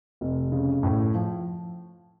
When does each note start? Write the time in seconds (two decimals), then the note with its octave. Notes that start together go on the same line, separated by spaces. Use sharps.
0.21 F1
0.52 C#3
0.83 A2
1.15 F3